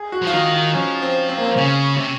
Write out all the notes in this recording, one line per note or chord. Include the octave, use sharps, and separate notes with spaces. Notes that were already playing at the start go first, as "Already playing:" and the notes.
Already playing: G#4
F#4
F3 F4
D#3 D#4
D#4
F3 C#4
C4
C4
A#3
C4
C#3 C#4
C3